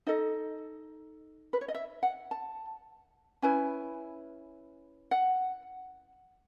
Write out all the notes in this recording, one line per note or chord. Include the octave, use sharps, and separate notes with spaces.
D#4 A4 D#5
B4
C#5
D#5
E5
F#5
A5
C#4 E4 B4 G#5
F#5